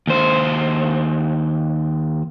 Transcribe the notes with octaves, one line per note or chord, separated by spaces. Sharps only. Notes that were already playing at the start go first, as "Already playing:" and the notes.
D#2 C5